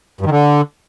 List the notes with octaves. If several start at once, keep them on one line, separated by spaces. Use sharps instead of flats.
G2
D#3
D3